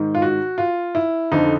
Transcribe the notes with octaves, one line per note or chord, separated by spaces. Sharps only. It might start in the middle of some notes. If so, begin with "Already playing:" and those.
Already playing: G#2 D#3
F4
F#4
F4
E4
F2 D3 F3 D#4